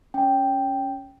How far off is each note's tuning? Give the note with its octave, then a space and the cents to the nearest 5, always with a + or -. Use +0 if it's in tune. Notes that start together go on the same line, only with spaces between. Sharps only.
C#4 +0 G5 +0